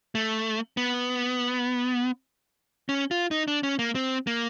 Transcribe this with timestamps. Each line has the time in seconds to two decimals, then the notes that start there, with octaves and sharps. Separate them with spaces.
0.15 A3
0.77 B3
2.89 C#4
3.11 F4
3.31 D#4
3.48 D4
3.63 C#4
3.79 A#3
3.95 C4
4.27 A#3